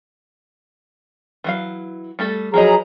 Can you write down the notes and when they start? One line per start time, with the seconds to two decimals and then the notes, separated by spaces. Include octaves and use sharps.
1.44 E3 F#3 F5
2.19 G3 A3 A4
2.54 F3 F#3 G#4 B4 D#5 A#5